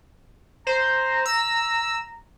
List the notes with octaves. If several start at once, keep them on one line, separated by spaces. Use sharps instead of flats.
C5 A#5
E6